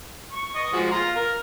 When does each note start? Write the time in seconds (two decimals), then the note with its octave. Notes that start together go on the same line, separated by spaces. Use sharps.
0.33 C#6
0.55 D#5 C#6
0.73 F3 G#3 F#4
0.91 F4 A#5 C6
1.16 A#4 F6